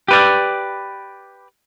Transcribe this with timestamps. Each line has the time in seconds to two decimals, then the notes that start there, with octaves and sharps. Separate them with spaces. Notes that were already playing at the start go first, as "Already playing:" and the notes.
0.08 G4 B4 D5